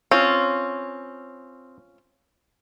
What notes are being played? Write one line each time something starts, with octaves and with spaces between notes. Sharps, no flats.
C4 C#4 F4